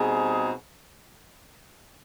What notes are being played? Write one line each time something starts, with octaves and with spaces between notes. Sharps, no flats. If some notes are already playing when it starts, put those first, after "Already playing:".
Already playing: B2 G3 C4 D#4 G#4